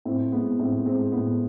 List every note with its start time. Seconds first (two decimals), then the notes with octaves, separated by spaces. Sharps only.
0.05 A2 C4
0.32 G#3 B3
0.59 A2 C4
0.86 G#3 C4
1.12 A2 B3